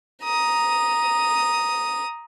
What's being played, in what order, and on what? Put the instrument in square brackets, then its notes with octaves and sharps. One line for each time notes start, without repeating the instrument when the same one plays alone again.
[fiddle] A#5 D#6